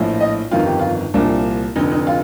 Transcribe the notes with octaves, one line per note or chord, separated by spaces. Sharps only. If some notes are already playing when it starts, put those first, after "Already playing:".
Already playing: A#1 A2 F3
D#5
G1 F2 D#3 F4
G4
F4
C2 A#2 F3 D4
F1 F2 D3 D#4
D#4
F4